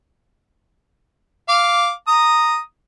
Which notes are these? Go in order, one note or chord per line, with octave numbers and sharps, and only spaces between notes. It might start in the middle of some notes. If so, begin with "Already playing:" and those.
F5 D6
A#5 D#6